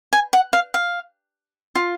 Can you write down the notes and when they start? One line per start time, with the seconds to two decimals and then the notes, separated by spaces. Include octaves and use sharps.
0.13 G#5
0.33 F#5
0.53 F5
0.74 F5
1.75 F4